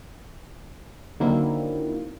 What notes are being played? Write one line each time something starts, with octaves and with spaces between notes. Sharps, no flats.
D3 D#3 F#3 A#3 C4 E4